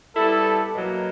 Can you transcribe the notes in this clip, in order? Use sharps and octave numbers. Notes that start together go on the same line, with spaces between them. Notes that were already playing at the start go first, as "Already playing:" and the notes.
G3 B3 E4 A4
B2 F#3 A#3